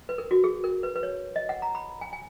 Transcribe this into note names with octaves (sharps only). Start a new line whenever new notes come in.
B4
A#4
F#4
G#4
A#4
B4
B4
C#5
D#5
F#5
A#5
B5
G#5
G#5